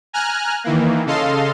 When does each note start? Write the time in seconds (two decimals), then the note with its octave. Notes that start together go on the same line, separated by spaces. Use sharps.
0.13 G#5 A#5 F6 F#6
0.64 D#3 E3 A#3
1.06 C#3 A4 D#5 F5 C6